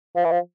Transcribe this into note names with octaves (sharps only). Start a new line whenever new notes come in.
F3
E3
F3